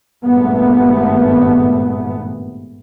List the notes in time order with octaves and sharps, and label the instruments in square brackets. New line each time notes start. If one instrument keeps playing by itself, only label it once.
[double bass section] G#1 G2 A#2 A3 B3